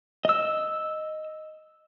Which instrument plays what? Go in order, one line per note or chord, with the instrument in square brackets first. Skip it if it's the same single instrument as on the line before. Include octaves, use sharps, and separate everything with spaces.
[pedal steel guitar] D#5 E6